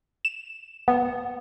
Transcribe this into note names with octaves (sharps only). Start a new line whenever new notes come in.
E7
B3